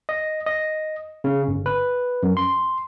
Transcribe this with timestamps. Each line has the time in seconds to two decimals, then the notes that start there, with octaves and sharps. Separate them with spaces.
0.09 D#5
0.46 D#5
1.24 C#3
1.48 G1
1.66 B4
2.23 F#2
2.37 C6